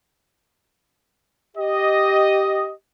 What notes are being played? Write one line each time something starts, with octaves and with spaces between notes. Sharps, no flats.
G4 D#5